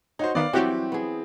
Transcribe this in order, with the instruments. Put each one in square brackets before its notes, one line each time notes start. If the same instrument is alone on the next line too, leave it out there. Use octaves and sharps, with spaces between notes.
[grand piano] D#4 F#4 C5 [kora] C#5
[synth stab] D#3 B3 [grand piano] D5 F5
[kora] E3 F#3 G3 [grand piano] C4 [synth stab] F#4 G4
[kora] B3 G#4